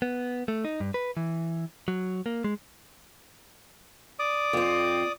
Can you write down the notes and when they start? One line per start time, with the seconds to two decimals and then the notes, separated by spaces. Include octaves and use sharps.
0.02 B3
0.48 A3
0.65 D#4
0.80 G2
0.94 B4
1.17 E3
1.88 F#3
2.26 A#3
2.44 G#3
4.19 D5 D6 D#6
4.53 F2 C4